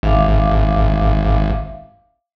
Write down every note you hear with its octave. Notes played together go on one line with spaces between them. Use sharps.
G#1 E5 F5 D6